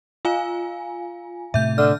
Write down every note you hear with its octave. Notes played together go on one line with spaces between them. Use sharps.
F4 F5 G#5
A2 C3 A3 E5 G6
D3 F6